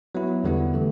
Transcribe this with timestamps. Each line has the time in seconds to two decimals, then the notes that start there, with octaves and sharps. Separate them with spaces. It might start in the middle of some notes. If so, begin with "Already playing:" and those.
0.15 F#3 B3 E4
0.44 E2 D3 G3 B3 E4
0.74 D3 A3